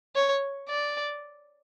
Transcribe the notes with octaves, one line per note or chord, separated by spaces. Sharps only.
C#5
D5